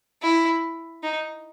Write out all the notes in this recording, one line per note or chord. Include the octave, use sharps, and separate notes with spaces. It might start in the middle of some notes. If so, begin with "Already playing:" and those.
E4
D#4